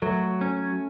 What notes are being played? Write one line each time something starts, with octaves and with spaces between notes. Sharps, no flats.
F#3 A3
C#4